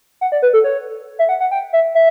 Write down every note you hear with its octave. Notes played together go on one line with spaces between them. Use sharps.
F#5
D5
B4
A4
C#5
E5
F#5
F#5
G5
E5
E5